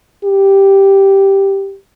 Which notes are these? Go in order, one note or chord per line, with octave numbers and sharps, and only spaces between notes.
G4